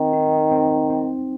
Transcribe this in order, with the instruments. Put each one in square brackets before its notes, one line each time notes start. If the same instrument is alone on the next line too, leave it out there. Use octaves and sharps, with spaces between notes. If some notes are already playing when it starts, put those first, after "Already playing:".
Already playing: [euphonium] D#3 [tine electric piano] C4
[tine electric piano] D#4
C4
C4